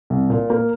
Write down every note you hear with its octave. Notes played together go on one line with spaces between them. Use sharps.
C2
A#2
A#3